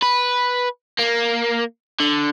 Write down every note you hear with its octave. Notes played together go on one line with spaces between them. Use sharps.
B4
A#3
D3